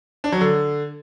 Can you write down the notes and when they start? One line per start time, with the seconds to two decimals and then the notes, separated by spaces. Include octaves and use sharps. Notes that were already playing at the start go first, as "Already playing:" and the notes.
0.24 D4
0.32 F#3
0.41 D3